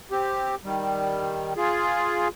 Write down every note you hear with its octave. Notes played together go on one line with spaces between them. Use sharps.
C4 G4
D#3 G3
F4 G#4